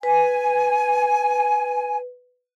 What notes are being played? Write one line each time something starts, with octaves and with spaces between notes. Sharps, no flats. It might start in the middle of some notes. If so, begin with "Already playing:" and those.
B4 G#5